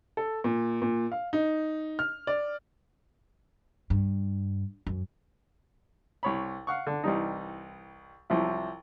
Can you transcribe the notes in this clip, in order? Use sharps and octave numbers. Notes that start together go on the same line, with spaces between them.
A4
A#2
A#2
F5
D#4
F6
D5
G2
F#2
C2 C#5 B5
F5 F#5 C#6
D3
C2 E3 G3 D#4
C2 F3 F#3 E4